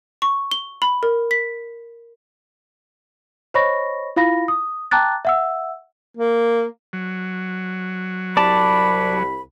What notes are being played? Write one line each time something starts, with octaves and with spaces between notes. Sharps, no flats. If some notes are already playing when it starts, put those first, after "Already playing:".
C#6
G7
B5
A#4
B6
C5 C#5 D#5 B5 C#6 A#6
E4 F4 F5 B5 A#6
D#6
G5 A5 A#5 D6 F#6 A6
E5 F#5 E6
A#3
F#3
C2 D5 A5 B5